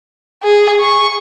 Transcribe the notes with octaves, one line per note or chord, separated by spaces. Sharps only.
G#4
C#6